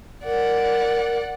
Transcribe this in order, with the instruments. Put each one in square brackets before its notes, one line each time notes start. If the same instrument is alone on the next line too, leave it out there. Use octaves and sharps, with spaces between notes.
[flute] A#4 [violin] D5 F#5